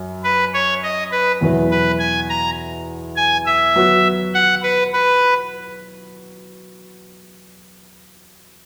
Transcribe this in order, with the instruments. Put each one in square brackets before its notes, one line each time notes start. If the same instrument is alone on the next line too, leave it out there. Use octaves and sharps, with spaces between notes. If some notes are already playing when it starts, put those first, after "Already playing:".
Already playing: [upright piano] F#2
[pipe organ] B4
C#5
D#5
B4
[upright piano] E2 B2 F#3 B3 E4
[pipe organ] B4
G#5
A#5
G#5
E5
[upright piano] F#3 B3 F#4
[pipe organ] F#5
B4
B4